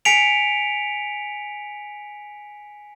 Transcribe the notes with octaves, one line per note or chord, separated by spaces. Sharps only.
G#5 B6 C#7 D7 F7